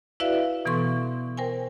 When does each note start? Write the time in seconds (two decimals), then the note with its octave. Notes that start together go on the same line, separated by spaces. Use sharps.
0.20 E4 F#4 B4 D5 E5 F5
0.65 B2 E3 B3 A4 C6 C#6
1.37 A#4 C5 G5 G#5